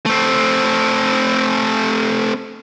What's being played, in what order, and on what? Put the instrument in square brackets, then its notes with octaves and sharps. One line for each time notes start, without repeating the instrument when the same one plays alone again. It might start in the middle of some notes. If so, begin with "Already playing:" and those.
[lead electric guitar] A3 C4